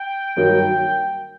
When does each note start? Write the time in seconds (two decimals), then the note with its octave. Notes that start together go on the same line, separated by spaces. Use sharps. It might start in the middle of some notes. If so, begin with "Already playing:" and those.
Already playing: G5
0.36 G2 D#3 F#3 A#3